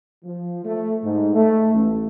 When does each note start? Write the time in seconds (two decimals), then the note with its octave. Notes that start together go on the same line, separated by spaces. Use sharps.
0.25 F3
0.65 A3
1.03 G#2
1.34 A3
1.74 A1